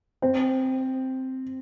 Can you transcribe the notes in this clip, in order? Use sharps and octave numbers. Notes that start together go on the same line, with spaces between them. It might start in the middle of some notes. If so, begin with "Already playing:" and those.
C4